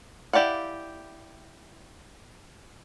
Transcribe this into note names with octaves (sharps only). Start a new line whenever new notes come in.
E4 G4 D5 F5 F#5